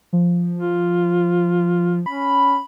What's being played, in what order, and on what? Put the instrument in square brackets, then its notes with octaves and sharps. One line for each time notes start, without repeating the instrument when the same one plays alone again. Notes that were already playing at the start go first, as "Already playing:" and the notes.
[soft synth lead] F3
[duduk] F4
[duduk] C#4 [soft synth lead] B5